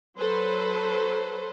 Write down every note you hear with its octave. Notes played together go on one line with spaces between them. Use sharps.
F#3 A4 B4 C5